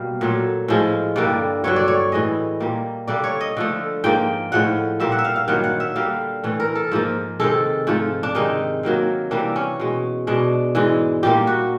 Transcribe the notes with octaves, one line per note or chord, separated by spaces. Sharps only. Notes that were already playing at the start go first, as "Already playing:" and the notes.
Already playing: B2 G3 A#3 F5
A#2 F#3 A3
A2 F3 G#3
G2 D3 G3 A#3 D5
G2 D3 F#3 C#5
D5
C#5
A2 E3 G#3 D#5
A#2 G3 A#3
D3 G3 A#3 D5
C#5
D#5
D3 F3 A3
G#2 F3 A#3 G5
A2 F3 G#3 F#5
A#2 G3 A#3 E5
F#5
E5
F5
F5
G2 D#3 F#3 A#3 F#5
F#5
E5
D3 G3 A#3 F5
A2 E3 A3
A#4
A4
G#2 F3 A#3
C3 D#3 G#3 A4
G#2 F3 A3
D4
C3 D#3 G#3 D#4
C3 D#3 F#3 A#3
C3 E3 G3 A#3 D4
C#4
B2 G#3
B2 G#3 D4
G#2 E3 G#3
A#2 G3 A#3 G4
F#4